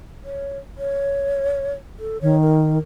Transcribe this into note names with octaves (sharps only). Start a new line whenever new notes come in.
C#5
C#5
A4
D#3 C#5
A#4